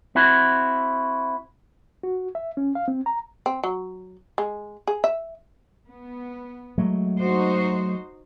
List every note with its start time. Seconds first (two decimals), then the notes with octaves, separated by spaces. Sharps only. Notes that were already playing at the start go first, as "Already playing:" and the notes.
0.15 C4 E4 F#4
2.03 F#4
2.35 E5
2.57 C#4
2.75 F5
2.88 C4
3.06 A#5
3.46 C4
3.64 F#3
4.38 G#3
4.87 G#4
5.04 E5
5.89 B3
6.78 F#3 G#3 A3
7.18 D#4 F#4 C5